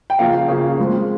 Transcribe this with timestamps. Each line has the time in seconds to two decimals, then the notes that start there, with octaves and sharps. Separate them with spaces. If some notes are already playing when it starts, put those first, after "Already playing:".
0.10 G5
0.19 C#3 F3 A#3 F5
0.48 C#3 F3 A#3
0.78 F3 G#3 C4